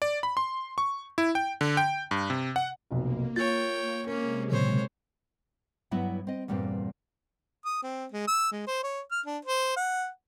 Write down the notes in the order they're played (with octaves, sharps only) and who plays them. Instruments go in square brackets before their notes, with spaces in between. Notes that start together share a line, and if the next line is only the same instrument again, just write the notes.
[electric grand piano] D5
B5
C6
C#6
E4
G5
D3
G5
G2
C3
F#5
[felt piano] F1 B1 [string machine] A#3
[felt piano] F4 [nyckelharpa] C#5 G5 [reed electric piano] A6
[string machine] C3 G#3 [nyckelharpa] A#3 C#4 [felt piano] A#4
[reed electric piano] A#2 C#3 F#3 [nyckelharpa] C5 C#5
[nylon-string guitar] G2 F#3 B3 E4 E5 F#5
C4 D#5
E2 G2 A#2 G3 C4
[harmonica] D#6
C4
G#3
E6
G#3
C5
C#5
F6
D4
C5
F#5